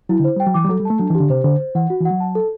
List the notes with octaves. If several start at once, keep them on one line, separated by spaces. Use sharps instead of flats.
F#3 E4
D3
C5
G3 G5
F#3
E3 D6
G3
F#3 A4
G3
A3 A5
F#3 D4
E3
G4
D3
C3 C5
D3 C5
C5
E3 F#5
F#4
E3
F#5
F#3
A5
A4